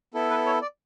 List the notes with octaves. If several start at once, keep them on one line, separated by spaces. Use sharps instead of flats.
B3 E4 A4
B4
C#5
D5